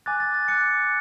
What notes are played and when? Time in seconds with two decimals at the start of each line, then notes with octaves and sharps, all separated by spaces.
0.06 G#5 D6 F#6 A6
0.20 A6
0.34 A6
0.48 G#5 D6 F#6 C#7